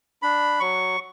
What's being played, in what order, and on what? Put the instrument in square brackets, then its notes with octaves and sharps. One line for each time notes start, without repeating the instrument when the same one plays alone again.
[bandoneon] D4 B5
F#3 C#6